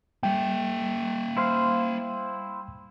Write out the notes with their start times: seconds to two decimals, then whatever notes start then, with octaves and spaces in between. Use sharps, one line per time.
0.23 G3 A#3 E5 G5
1.37 E4 C5 F5